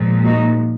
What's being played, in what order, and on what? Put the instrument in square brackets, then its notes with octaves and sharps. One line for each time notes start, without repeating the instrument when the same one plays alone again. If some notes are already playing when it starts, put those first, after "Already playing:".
Already playing: [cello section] A#2 F3 G#3
D#4 F#4